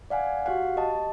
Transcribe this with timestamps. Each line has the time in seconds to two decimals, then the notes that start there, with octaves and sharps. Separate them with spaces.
0.10 D5 F5 F#5 G#5
0.46 F#4 G4 F5 F#5
0.76 G4 D#5 A5